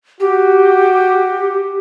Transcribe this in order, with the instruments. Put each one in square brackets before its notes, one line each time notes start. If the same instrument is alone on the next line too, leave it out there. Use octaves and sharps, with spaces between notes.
[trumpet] F#4 [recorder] G4